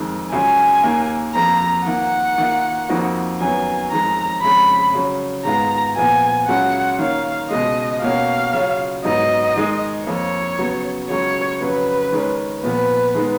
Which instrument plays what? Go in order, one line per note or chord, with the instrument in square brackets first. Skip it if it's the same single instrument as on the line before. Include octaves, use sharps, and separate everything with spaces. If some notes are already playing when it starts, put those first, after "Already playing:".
Already playing: [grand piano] F2 D#3 G#3
[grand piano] C#2 C#3 F#3 C#4 [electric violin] G#5
[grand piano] D#2 D#3 A#3
[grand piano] F2 F3 A#3 [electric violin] A#5
[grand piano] D#3 A#3 F4 [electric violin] F#5
[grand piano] D#3 A#3 F4
F2 F3 A#3 D#4 F#4
[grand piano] F#2 D#3 F#3 B3 [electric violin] G#5
[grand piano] F2 D#3 G#3 [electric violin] A#5
[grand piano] F2 C#3 G#3 [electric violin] B5
[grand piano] C#3 F#3 C#4
[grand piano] G#2 D#3 G#3 B3 F4 [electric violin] A#5
[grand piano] A#2 F3 B3 F4 [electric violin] G#5
[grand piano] C#2 C#3 F#3 C#4 F4 [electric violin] F#5
[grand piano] D#3 A#3 C#4 [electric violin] F5
[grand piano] C#2 B2 G#3 [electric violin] D#5
[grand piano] B2 A#3 C#4 F#4 [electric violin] F5
[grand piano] C#3 F#3 C#4 F4
[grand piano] G#2 F#3 B3 D#4 [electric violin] D#5
[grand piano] D#3 G#3 D#4
[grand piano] F2 F3 A#3 [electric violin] C#5
[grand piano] C#3 F#3 B3
[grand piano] C#2 C#3 F#3 C#4 [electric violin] C#5
[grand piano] F2 C#3 F#3 [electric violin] B4
[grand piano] D#3 G#3 C#4
[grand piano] A#2 F3 B3 [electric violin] B4
[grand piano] D#3 G#3 B3 D#4